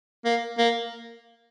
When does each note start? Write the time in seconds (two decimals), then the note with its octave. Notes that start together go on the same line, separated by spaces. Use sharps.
0.25 A#3
0.58 A#3